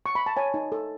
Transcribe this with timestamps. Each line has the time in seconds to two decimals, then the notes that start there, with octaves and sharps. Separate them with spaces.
0.06 C#6
0.15 B5
0.26 A5
0.37 C#5 G#5
0.54 D#4
0.72 A4